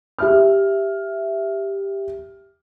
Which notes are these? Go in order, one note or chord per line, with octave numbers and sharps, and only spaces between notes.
G4 E5 F6